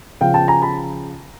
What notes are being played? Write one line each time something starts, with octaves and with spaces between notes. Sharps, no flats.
C#3 F3 F5 G5
G5 A5
G#5 A#5
A5 B5